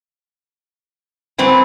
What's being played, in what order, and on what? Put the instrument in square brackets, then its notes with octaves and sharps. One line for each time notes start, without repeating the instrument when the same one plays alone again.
[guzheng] E3 F#3 C4 [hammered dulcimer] B4 C5 G5